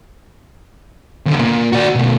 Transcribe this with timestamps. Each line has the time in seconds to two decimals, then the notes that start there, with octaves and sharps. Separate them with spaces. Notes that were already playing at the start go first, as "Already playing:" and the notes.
1.26 D#2 D3
1.40 A#2
1.72 F#4 D5
1.95 B2 A3